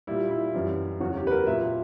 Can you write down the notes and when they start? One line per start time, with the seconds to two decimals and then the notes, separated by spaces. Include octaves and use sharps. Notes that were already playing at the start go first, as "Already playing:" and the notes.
0.07 A#2 G3 E4
0.31 E4
0.54 F#2 E3 G3
1.00 E2 C#3 F#3 F#4
1.17 G4
1.27 B4
1.31 A#4
1.47 A#2 F#3 E5